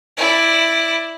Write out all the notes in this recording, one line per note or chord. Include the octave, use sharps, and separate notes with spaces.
E4 D5